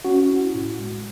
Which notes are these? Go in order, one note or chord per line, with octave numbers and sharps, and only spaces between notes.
C#4 F#4
E4
A2
G#3